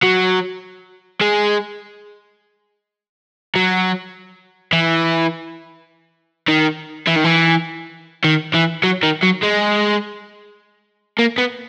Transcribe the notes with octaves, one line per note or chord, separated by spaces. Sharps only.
F#3
G#3
F#3
E3
D#3
E3
D#3
E3
D#3
E3
F#3
D#3
F#3
G#3
A#3
B3